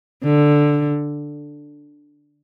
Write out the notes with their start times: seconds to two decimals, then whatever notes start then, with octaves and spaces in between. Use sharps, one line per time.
0.23 D3